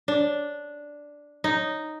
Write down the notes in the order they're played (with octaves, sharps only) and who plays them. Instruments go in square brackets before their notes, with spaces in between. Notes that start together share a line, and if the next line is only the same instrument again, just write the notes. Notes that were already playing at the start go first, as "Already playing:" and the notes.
[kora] D4
D#4